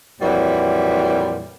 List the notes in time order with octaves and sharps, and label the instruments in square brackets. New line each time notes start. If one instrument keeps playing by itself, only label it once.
[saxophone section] F2 A#2 E3 F#3 G3